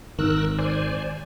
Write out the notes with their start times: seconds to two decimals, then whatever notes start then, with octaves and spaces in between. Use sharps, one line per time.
0.19 G#1 D#3 A#4 E6 F#6
0.59 C5 D5 G#5